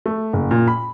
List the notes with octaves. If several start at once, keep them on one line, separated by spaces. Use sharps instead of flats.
A3
F#1
A#2
B5